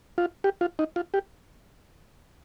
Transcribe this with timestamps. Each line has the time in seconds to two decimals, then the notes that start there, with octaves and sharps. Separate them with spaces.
0.18 F4
0.44 G4
0.61 F4
0.79 D#4
0.96 F4
1.14 G4